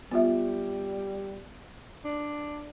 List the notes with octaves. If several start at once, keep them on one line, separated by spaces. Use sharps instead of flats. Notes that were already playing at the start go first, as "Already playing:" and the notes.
G3 B3 F4 E5
D4